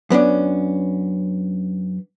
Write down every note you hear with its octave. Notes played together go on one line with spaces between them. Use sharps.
F#2 B3 C#4 D4